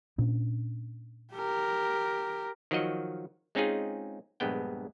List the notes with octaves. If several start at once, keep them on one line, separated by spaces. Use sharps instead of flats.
A#2 C#4 D4
G4 A#4
D#3 F3 F#3 F#4 D#5
G#3 C4 C#4 D#4 F4 G#4
A#1 G2 G#3 B3 G5